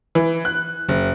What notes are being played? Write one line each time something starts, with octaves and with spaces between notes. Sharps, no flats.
E3
F#6
F#1